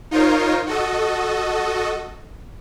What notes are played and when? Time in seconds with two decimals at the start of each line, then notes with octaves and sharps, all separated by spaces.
0.11 D#4 F4 A#4 C5 C#5
0.67 F#4 A4 D#5